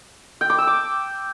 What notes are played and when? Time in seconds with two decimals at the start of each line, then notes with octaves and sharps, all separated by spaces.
0.41 G5
0.50 D6
0.58 E6
0.67 D6